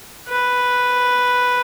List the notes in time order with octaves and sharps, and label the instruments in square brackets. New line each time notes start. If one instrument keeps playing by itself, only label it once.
[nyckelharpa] B4